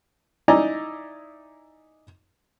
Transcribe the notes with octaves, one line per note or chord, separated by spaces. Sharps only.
D#4 E4 D5 D#5 G#5 A#5